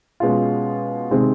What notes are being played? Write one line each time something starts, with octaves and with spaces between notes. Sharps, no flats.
B2 G#3 C#4 F4
C3 D#3 G#3 C4